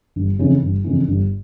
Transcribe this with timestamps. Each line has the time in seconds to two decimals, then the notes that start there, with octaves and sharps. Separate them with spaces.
0.16 G1
0.39 F2 C#3 E3
0.63 G1
0.84 F2 C#3 E3
1.08 G1